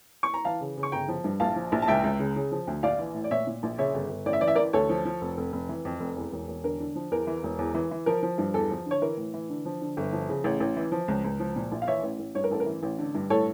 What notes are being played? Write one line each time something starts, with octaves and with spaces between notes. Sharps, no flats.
C#6
A#5
E3 F5 A5
C#3
C#3
C#6
G1 G5 A#5
F3
G2
A#1 F5 A5
F3
A#1
A5
C#2 E5 G5
C#2
C#3
C#3
F3
D2
A#1 D5 F5
E3
A2
D5
A#2 C#5 E5
A#2
A#1
C#3 C#5 E5
G1
G1
A1 D5
E5
E3 D5
E5
E3 A#4 D5
D2 A4 C#5
F3
F3
F1
F1
F1
E3
F2
F1
E2
E1
E1
D3 A#4
D3
F3
E2 A#4
E3
E1
E2
E3
E3
F3 A#4
F3
G2
E2 A4
F3
D3 C#5
E3 A#4
A2
E3
D3
F3
D3
G1
F3
C#3
A1
A1
E3
F3
C#2
C#2
F3
A#2
A#1
F5
E3 C#5 E5
A1
A1
G2 C#5
A#4
A1 A4
A#4
E3
A1
D3
G2
A2 A4 C#5